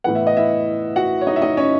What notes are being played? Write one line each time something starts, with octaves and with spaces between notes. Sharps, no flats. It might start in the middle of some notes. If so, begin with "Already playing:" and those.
A2 E3 B3 F#5
E5
D#5
E4 E5
F#4 F#5
C#5
D#4 D#5
E5
D#4 D#5
C#4 C#5